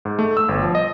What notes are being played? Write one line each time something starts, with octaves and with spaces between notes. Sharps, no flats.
G#2
A3
E6
G1
F3
D#5